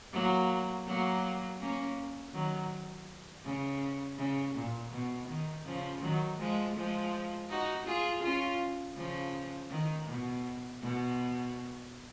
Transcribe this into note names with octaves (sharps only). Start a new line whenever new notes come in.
F#3 A#3
F#3 A#3
A#3 C#4
D#3 F#3
C#3
C#3
A#2
B2
D#3
C#3 F3
D#3 F#3
F3 G#3
F3 G#3
D#4 F#4
F4 G#4
C#4 F4
C#3 F3
D#3
B2
B2